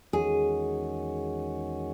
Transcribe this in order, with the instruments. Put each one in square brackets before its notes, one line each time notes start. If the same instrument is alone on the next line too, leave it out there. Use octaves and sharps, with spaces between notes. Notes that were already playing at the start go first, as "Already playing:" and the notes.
[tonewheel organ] E2 D#3 G#3 C#4 F#4 [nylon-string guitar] G#4